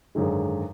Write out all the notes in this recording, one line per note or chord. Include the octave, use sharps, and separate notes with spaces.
G#1 F#2 D3 G#3